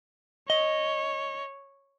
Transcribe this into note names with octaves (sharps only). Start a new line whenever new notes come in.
C#5 D#5